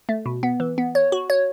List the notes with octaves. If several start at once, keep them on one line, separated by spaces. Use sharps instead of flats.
A3
B2
B3
E3
B3
C#5
F#4
C#5